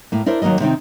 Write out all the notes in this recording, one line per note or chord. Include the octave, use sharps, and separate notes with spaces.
A2 A#3
D4 E4 A#4 C5
D#2 F#3 A#3 A#4 D#5
C3 D#3 C4 D#4